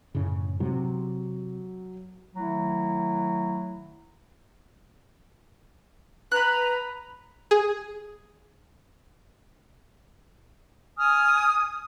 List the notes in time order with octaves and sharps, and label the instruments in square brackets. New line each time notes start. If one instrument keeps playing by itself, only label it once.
[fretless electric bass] F#2 A2 C#3
[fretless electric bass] C3 [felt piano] F#3
[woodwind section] D#3 F#3 A3 E4
[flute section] B4 A#5 [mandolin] B5 F#6
[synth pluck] G#4
[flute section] G#5 D#6 F6